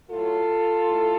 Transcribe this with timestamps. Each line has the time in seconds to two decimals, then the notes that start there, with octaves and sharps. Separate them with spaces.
0.11 A2 F#3 F4 A4
0.88 A2